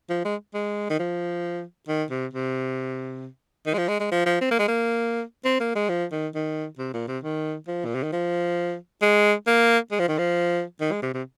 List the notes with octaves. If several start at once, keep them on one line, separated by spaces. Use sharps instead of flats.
F3
G#3
G#3
D#3
F3
D#3
C3
C3
D#3
G#3
F3
G#3
G#3
F3
F3
C4
A#3
G#3
A#3
C4
A#3
G#3
F3
D#3
D#3
C3
A#2
C3
D#3
F3
A#2
C3
D#3
F3
G#3
A#3
G#3
F3
D#3
F3
D#3
G#3
C3
C3